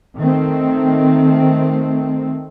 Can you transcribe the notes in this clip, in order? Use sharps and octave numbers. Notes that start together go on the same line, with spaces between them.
D#3 A3 C4